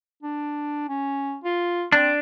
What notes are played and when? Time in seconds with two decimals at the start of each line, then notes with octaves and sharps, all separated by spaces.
0.23 D4
0.89 C#4
1.44 F4
1.92 C4 D4